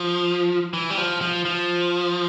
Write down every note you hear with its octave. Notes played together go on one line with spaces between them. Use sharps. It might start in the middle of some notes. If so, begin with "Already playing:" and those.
Already playing: F3
E3
G3
F3
F3
F3